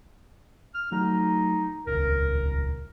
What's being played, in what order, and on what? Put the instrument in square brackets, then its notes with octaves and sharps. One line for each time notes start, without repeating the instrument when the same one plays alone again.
[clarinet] F6
[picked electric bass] F#3 A3 [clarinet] D#4
[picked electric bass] D#1 C#2 [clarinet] A#4